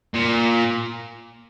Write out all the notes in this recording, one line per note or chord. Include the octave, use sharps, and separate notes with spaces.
A#2